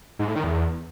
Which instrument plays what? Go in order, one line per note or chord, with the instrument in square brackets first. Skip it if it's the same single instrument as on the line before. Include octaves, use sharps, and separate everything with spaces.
[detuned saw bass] G#2
A2
D#3
E2